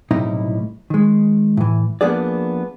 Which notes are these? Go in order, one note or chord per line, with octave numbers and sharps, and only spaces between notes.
B1 A2 C3 G3 D#4 E4
D#3 G#3
A2 E3
F3 A#3 B3 D4 G#4 D5